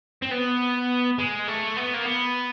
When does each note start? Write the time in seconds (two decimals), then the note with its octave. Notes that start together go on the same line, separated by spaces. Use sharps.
0.22 C4
0.31 B3
1.19 G#3
1.48 A3
1.77 B3
1.94 A#3
2.06 B3